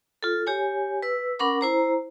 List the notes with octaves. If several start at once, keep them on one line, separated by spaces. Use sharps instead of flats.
F4 A4
G4 C#5 G#5
B4 E6
C#4 A#4 F#5 B5 D6
E4 C5 A#5